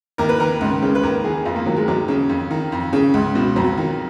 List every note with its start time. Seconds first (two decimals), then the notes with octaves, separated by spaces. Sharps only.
0.18 D#2 A#4
0.29 B4
0.40 D#3 A#4
0.61 C#2
0.82 C#3
0.95 B4
1.03 D#2 A#4
1.24 D#3 G#4
1.45 F2 F4
1.56 A#3
1.66 D#3 F#3
1.76 G#3
1.88 D#2 F#3
2.08 C#3
2.29 F2
2.51 D#3
2.72 F2
2.93 C#3
3.14 C#2
3.35 B2
3.56 F2 F#3
3.77 D#3